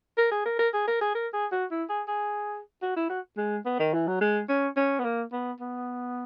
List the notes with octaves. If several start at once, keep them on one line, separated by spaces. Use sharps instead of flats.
A#4
G#4
A#4
A#4
G#4
A#4
G#4
A#4
G#4
F#4
E4
G#4
G#4
F#4
E4
F#4
G#3
B3
D#3
E3
F#3
G#3
C#4
C#4
B3
A#3
B3
B3